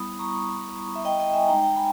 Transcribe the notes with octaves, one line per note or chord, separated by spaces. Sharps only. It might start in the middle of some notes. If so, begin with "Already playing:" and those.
Already playing: G3 B3 E4 B5 D#6
A#5 C#6
E5
D#5 G5
D#5 G5
E5 G#5
G#3 D#4 G5 A#5
G5 A#5
G#5 B5